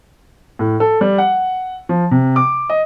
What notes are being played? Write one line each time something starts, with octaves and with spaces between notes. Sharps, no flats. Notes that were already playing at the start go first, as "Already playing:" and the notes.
A2
A4
G3
F#5
F3
C3
D6
D#5